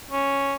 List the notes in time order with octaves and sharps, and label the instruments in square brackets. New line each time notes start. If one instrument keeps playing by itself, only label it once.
[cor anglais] C#4